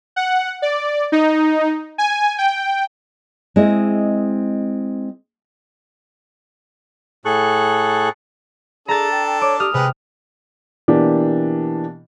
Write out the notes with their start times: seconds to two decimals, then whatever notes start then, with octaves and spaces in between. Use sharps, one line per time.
0.16 F#5
0.62 D5
1.12 D#4
1.98 G#5
2.38 G5
3.56 G#3 C4 E4 D#5
7.25 A2 G#4 A4 C#6 F#6
8.88 D4 G#4 A4 A#5 A6
9.11 G5
9.27 G5
9.41 C#5 D6
9.60 G4 D#6 F6
9.74 C3 G#3 G#4 B4 G5
10.88 B2 E3 A#3 D4 G4